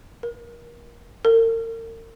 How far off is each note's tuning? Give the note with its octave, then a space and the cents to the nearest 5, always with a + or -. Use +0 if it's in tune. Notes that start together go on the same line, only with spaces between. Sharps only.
A#4 +25
A#4 -40